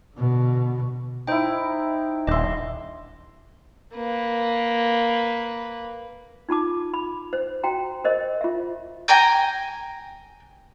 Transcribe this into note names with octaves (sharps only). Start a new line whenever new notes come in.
B2 D3
D#4 E4 C5 G5
D#1 D4 D#5 E5 C6
A#3 B4
D#4 F4 A5 D6
B5
C5
F#4 G5 A#5
A#4 C5 D#5
F4 E5
G5 G#5 A#5 G6